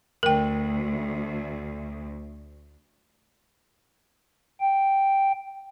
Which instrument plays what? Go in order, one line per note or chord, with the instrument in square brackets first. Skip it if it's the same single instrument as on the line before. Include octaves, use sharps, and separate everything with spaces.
[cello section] D2 [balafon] A#4 G5
[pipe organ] G5